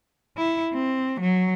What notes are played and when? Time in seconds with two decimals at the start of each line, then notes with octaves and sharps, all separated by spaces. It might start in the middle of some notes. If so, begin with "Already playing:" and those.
0.38 E4
0.74 C4
1.21 F#3